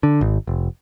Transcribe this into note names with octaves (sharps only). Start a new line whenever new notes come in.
D3
G#1
F1